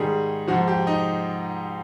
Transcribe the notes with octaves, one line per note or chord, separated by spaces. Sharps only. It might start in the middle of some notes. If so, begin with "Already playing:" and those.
Already playing: G#2 D#3 G3 G#4
G#2 F3 F#4
G4
D#4